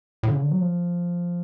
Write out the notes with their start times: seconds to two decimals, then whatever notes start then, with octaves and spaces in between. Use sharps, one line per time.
0.23 A2
0.28 D3
0.32 C#3
0.42 D3
0.51 F#3
0.61 F3